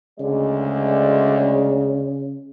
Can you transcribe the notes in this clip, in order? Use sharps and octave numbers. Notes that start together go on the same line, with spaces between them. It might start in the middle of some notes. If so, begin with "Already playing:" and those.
D2 C#3 G#3 D5